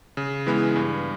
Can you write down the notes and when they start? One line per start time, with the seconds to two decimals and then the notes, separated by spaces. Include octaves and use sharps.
0.17 C#3
0.46 E3 G#3 B3 E4
0.76 G2